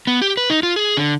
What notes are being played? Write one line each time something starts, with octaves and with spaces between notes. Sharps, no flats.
B3
G4
B4
D#4
F4
G#4
D3